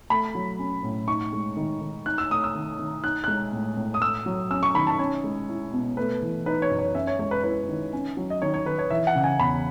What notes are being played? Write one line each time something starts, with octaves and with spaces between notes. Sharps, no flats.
A3 B5
F#3
C#4
A2
D#4 C#6
G#3
D#3
D#3
D#4 F#6
E6
A3 D#6
E6
D#3
D#3
D#4 F#6
G#3 F#6
A2
A2
D#6
A3 E6
F#3
C#4 E6
C#6
D#3 B5
A5
C#4 C#5
G#3
E4
B2
A3 B4
E3
D#4 B4
C#5
F#2
C#5
C#4 E5
C#5
G#3 C#5
B4
E4 B4
D#3
C#4
F#3
D#5
D#3 C#5
C#5
D#3 B4
C#5
E3 E5
F#5
C#3
G#5
E2 B5